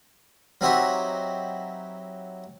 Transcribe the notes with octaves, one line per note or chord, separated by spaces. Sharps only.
F#3 C4 D#4 E4 F#4 G4